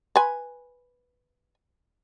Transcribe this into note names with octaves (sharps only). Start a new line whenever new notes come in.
B4 G#5